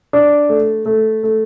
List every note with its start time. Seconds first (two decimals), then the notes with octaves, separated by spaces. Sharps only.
0.13 D4
0.49 A3
0.86 A3
1.23 A3